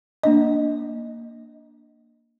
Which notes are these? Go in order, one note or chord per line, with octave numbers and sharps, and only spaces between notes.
A#3 D4 D#5